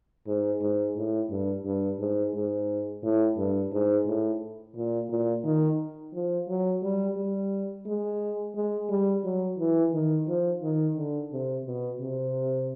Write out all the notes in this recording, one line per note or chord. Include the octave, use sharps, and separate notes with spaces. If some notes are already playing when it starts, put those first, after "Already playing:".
G#2
G#2
A2
G2
G2
G#2
G#2
A2
G2
G#2
A2
A#2
A#2
D#3
F3
F#3
G3
G3
G#3
G#3
G3
F#3
E3
D#3
F3
D#3
D3
C3
B2
C3